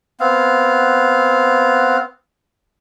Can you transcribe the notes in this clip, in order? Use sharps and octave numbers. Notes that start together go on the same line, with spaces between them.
B3 C4 F5